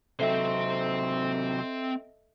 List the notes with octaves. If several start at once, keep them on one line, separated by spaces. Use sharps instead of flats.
C3 F#3 C4 A4 C5 D#5 E5